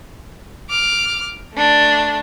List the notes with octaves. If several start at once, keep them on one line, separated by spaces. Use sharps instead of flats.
D6 F6
A3 D4